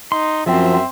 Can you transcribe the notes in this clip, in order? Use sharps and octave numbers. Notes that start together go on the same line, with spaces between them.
D#4 C6
F#2 F3 C4 E5